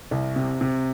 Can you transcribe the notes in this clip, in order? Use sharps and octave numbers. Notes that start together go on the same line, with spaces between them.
C2
C3
C3